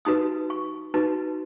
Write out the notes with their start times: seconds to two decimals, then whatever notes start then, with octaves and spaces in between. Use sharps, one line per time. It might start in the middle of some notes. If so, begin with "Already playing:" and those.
0.05 D#4 F#4 B4 D#6
0.50 C#6
0.94 D#4 F#4 B4